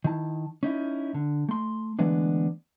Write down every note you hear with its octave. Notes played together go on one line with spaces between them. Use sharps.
D#3 D#4 E4 A5
C#4 D#4 E4
D3
A3 C6
D3 E3 G#3 A3 B3 D4